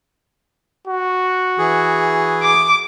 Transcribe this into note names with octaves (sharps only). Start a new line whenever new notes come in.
F#4
E3 G#4
D6